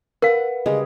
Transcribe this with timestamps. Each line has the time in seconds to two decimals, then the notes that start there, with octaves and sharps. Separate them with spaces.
0.22 A#4 B4 F5 F#5
0.66 C#3 G3 G#3 G#4